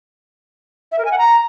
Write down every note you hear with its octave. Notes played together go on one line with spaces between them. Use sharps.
E5
A#4
G#5
F#5
A#5